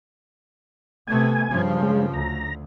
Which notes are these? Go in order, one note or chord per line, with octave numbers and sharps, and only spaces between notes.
C3 A3 B3 G#5
G2 C#3 F3
G#3
D2 A#5